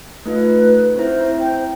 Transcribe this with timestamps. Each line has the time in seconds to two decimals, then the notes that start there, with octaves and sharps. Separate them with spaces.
0.26 A3 D#4 F4 B4
0.96 C4 E4 C5
1.39 G5